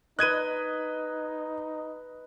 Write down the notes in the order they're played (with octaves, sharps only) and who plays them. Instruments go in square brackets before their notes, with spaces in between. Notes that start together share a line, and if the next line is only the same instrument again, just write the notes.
[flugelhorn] D#4 [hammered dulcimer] B4 D#5 [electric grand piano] F#6 G#6 D#7